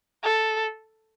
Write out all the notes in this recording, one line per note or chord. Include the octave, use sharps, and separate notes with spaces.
A4